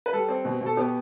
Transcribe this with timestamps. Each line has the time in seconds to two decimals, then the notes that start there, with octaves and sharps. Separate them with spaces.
0.06 B4
0.13 G3 A4
0.29 C4
0.45 B2
0.61 B2
0.66 A4
0.77 B3 G4